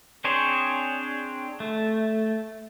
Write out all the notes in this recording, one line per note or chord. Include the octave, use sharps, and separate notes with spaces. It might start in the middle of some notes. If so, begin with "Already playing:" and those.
C4 D4 G#4 C5 C#5
A3